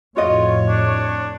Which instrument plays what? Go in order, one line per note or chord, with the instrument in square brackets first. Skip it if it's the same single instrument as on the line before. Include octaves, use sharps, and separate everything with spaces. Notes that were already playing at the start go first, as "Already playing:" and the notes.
[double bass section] F2 A2 [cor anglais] F4 [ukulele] F#4 D#5 [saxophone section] C#5
[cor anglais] D4